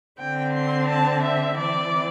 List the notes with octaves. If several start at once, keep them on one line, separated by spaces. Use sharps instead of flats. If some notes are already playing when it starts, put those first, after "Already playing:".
D3 C4 G5
C6
A5
E5
E3 C4 D5